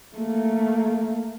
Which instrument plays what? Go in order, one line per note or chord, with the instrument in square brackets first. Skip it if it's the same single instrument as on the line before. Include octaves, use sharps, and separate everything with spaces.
[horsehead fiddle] A3 A#3